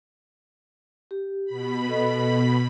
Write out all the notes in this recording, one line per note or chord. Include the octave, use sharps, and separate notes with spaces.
G4
B2 B5
B3 A4 D#5